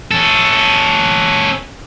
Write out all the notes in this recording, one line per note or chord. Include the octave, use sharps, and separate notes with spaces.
C#4 A4